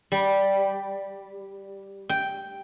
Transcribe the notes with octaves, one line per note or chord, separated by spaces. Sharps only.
G3
G5